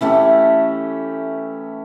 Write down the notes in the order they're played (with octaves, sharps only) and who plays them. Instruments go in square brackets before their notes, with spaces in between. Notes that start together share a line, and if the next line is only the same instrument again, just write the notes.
[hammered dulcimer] E3 A3 C#4 G4